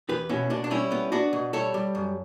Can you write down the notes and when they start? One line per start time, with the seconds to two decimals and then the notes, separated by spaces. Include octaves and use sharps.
0.09 E2 G4 B4
0.29 B2 C#4 E4
0.50 B2 D4
0.64 D4
0.71 G3 C#4 E4
0.92 B3
1.12 B3 D4 F#4
1.33 B2
1.53 G3 A4 C#5
1.74 G3
1.95 F#2